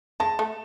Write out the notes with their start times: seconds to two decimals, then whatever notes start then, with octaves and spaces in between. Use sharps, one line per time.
0.20 G#3 A5
0.39 A3